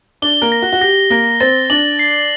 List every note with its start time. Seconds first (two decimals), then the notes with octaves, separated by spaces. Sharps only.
0.22 D4 D5 G7
0.42 A#3 A#4
0.52 A#6
0.62 F#4
0.73 F#4
0.81 G4 A#6
1.10 A#3 A#4 A#6
1.40 C4 C5 A6
1.70 D4 D5 F#7
1.99 C7